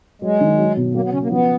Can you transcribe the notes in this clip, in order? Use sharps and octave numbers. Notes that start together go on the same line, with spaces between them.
F#3 G#3
D#3
F#3
B2
F#3 A#3
B3
C#3 C#4
A#3
F3 B3